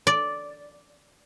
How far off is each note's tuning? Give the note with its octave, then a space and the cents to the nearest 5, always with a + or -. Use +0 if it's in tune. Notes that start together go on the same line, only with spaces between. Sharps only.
D5 -5